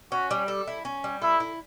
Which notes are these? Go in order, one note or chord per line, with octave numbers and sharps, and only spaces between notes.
C#4 F#4
G3
A4
E4
C#4
G3
E4 A4
E4